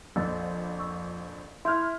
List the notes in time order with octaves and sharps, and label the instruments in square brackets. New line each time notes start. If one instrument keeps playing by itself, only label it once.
[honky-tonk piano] A#1 F2 [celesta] E6 A6
[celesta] C#6 E6
[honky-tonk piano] E4 F6 [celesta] C6 G6 G#6